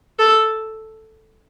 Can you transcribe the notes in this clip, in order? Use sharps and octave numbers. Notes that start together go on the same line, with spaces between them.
A4